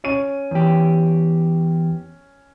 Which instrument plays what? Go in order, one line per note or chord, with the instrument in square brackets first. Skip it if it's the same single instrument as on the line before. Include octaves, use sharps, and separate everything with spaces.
[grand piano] C#4 C#6 D#7
[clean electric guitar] E2 G4